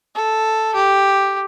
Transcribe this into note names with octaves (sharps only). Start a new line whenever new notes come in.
A4
G4